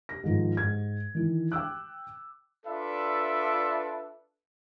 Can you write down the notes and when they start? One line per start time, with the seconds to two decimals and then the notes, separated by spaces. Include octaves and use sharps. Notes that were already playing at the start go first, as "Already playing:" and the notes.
0.09 G4 A#6
0.24 G#2 D#3 F3
0.57 G#2 G#6
1.15 D#3 E3
1.52 G5 D6 E6 F#6
2.66 D4 F4 A4 B4 D5 E5